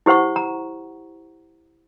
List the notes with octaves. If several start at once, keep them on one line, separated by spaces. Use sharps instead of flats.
E4 G4 C5 F#5 C#6
A#5